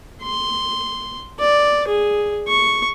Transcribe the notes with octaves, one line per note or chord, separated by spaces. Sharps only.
C6
D5
G#4
C#6